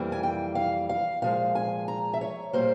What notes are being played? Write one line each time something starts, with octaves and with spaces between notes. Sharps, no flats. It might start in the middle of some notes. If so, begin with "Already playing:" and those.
Already playing: F2 E3 G3 A#3
G#5
G5
F5
F5
A#2 F3 G#3 F5
G#5
A#5
E5
C#5
A#2 G3 A#3 C5